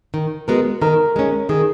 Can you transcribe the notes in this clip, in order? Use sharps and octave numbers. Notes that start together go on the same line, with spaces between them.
D#3
G#3 B3 F#4 A#4
D#3 A#4
G#3 C#4
D#3 G#4